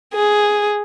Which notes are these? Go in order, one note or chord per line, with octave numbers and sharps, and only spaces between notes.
G#4